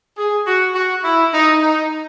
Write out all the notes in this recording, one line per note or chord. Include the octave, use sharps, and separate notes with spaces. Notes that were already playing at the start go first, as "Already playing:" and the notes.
G#4
F#4
F#4
E4
D#4
D#4